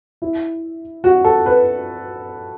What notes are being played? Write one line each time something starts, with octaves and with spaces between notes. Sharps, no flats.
E4
F#4
A4
B4